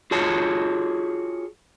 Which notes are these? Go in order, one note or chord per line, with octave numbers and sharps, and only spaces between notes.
F4 F#4 G#4 C#5 A5